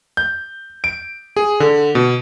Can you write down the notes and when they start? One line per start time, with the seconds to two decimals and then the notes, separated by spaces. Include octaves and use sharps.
0.17 G6
0.84 D7
1.36 G#4
1.60 D3
1.95 B2